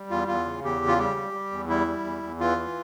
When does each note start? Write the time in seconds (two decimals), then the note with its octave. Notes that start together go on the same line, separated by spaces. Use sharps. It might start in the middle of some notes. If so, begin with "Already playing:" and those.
Already playing: G3
0.10 E2 F4
0.28 E2 F4
0.46 C#3
0.63 E2 G4
0.82 C#3
0.87 F4
0.98 G3 G4
1.17 G3
1.33 G3
1.52 E2
1.69 G3 E4
1.87 G3
2.04 E2
2.23 E2
2.40 E3 F4
2.58 E3